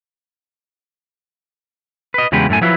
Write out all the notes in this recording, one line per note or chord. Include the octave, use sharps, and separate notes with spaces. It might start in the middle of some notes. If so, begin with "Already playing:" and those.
B4 D#5
E2 C#3 F#3 G#3 G4 B4
F#2 A2 A3 G#5
F3 F#3 E4 B4